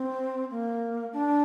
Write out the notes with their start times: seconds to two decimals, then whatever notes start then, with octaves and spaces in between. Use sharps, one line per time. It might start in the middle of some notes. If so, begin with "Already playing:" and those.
Already playing: C4
0.50 A#3
1.13 D4